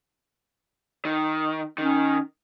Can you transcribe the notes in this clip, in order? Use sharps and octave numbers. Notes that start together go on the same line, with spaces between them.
D#3
D#3 C#4